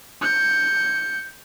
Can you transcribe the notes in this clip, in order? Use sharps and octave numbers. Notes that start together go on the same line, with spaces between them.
G6 C#7